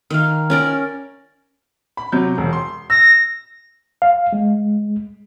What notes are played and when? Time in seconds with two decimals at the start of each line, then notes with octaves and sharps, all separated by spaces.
0.10 D#3 F5
0.50 C#4 A#4 D5
1.97 B5
2.12 C3 F#3 G6
2.38 E1
2.53 C6
2.90 E6 A#6
4.02 F5
4.33 G#3